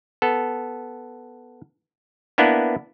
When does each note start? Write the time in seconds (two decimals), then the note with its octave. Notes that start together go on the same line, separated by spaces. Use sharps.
0.22 B3 A4
2.38 A#3 B3 D4 E4 B4